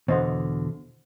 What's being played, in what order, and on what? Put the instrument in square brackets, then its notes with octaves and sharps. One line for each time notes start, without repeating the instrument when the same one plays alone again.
[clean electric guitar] E2 D3 [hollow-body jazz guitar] B2 [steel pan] C5 D#5 F#5